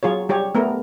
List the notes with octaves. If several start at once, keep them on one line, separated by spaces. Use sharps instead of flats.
F#3 F4 G#4 C#5
G3 G4 C#5
A3 B3 A#4